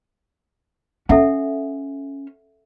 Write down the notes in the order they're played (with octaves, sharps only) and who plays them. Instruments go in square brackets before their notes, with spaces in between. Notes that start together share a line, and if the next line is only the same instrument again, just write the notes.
[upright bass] C#4 [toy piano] A4 E5 F#5